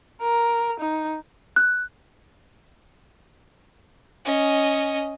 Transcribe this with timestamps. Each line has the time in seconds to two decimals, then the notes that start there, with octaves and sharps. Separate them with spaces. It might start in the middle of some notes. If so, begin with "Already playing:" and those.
0.22 A#4
0.80 D#4
1.56 F#6
4.25 C#4 D#5